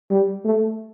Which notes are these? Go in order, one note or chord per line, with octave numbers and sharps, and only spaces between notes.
G3
A3